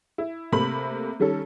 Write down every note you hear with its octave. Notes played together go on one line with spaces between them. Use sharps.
E4
C3 A3 A#3 B5 F#7
D#3 G3 C#4 A4